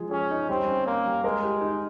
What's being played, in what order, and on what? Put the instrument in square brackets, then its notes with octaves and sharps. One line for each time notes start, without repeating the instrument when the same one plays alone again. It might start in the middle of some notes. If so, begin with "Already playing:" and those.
Already playing: [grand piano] F3 G#3 G#4
[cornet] C#4 [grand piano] G#4
[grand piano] D#4
[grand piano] G3 [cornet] C4
[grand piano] C#4
[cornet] A#3 [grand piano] C#4
[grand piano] G3
[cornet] G#3 [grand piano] A#4
[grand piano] G4
D#4